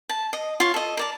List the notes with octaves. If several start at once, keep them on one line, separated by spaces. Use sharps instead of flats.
A5
D#5
F4 C#5
A4 D#5
A#4 D5 A5